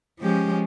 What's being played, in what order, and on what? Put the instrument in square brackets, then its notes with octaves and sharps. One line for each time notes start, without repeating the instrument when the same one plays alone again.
[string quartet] F3 G#3 C#4 G4